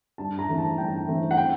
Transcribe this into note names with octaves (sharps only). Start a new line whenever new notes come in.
G2 A5
A#5
E3 A3 C4
A5
G2 G5
E3 A3 C4
F#5
G5